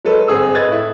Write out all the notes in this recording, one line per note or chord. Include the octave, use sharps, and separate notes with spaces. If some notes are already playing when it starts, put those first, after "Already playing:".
F#3 G#3 A4 B4
G1 C4 G#4 D#6 E6
B4 D#5 F#6 G#6 A6
A2 E4